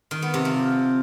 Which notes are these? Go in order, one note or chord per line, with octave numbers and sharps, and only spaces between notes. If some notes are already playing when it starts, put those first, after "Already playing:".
D#3
B3
C3
F3